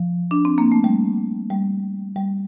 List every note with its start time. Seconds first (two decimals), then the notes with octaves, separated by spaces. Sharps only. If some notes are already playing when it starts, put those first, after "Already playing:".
Already playing: F3
0.31 D4
0.45 C4
0.58 A#3
0.72 A3
0.84 G3
1.50 G3
2.16 G3